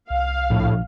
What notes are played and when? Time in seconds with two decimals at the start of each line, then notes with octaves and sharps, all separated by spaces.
0.10 C2 F5
0.50 A#1 A2